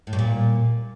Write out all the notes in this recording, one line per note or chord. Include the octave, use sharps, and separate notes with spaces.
A2
G2
A#2